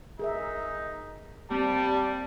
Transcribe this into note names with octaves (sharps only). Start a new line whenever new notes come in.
D#4 G#4 A#4 E5
G3 A#3 C4 A5